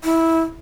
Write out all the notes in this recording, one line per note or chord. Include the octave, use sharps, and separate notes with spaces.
E4